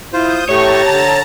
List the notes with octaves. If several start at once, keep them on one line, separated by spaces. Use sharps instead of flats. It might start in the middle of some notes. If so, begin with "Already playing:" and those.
E4 F4 C5 D#6 G6
A2 A3 G4 C#5 A5 A#5 C#6 A6
D3